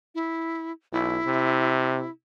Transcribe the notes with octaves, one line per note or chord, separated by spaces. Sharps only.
E4
B1 E4
C3